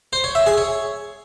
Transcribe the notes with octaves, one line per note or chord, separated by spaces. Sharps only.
C5
C#5
E5
G#4
C#5